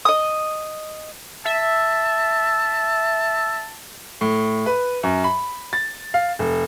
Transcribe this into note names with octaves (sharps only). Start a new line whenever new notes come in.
D#5 D#6
E5 A5
A2
B4
F#2
B5
A6
F5
F1